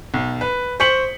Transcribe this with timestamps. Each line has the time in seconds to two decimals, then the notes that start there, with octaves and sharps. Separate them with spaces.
0.14 B1
0.41 B4
0.80 C5 C#6 G6 B6 C#7 F#7